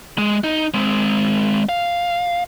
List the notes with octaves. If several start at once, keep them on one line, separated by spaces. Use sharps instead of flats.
G#3
D#4
G#3 C4
F5